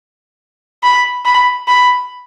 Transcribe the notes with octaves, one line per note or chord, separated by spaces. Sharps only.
B5
B5
B5